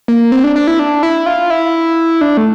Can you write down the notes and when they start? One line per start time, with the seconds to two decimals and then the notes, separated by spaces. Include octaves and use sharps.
0.08 A#3
0.32 C4
0.44 D4
0.56 D4
0.67 E4
0.79 D4
1.03 E4
1.26 F4
1.50 E4
2.21 D4
2.37 A3